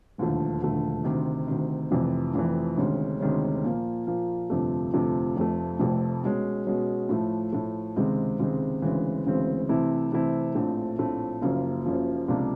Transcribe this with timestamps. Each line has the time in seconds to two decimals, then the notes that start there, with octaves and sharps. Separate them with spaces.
0.18 E1 D#2 D3 F3 A3
0.61 E1 D#2 D3 F3 A3
1.04 D2 C3 D#3
1.47 D2 C3 D#3
1.91 F1 F2 C3 E3
2.34 F1 F2 C3 E3
2.77 D2 C3 D#3 G#3 C#4
3.20 D2 C3 D#3 G#3 C#4
3.64 A#2 F3 A#3
4.07 A#2 F3 A#3
4.50 G1 F2 C3 F3 A3
4.94 G1 F2 C3 F3 A3
5.36 F1 F2 C3 F3 A3
5.80 F1 F2 C3 F3 A3
6.23 B2 G#3 C#4
6.66 B2 G#3 C#4
7.09 A2 F3 A3
7.53 A2 F3 A3
7.96 C#2 C3 D#3 G#3 C4
8.40 C#2 C3 D#3 G#3 C4
8.82 D2 C#3 E3 G#3 C4
9.26 D2 C#3 E3 G#3 C4
9.69 C3 E3 A3 C4 E4
10.12 C3 E3 A3 C4 E4
10.55 A#1 A2 F3 A3 C4
10.99 A#1 A2 F3 A3 C4
11.41 F#1 F#2 C#3 F3 A#3
11.85 F#1 F#2 C#3 F3 A#3
12.28 C#2 C3 F3 A#3 D4